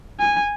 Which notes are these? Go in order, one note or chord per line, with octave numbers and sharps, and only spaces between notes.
G#5